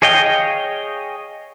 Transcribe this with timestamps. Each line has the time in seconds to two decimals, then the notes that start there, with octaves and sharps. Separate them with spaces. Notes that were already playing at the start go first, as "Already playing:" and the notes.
0.02 G#4 C#5 D#5 F5 G5